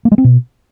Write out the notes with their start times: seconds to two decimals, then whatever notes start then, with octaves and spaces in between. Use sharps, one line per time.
0.05 A#3
0.12 G#3
0.18 C4
0.24 B2